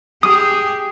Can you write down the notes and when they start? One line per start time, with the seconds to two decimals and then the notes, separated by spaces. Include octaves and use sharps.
0.23 G4 G#4 D#6